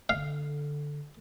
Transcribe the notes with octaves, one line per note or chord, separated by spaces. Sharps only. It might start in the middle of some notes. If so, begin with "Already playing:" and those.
D3 F5